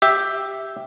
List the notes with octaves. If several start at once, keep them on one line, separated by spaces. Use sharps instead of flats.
G4 E5